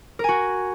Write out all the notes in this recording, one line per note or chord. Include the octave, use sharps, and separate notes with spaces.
F#4 A#4 G#5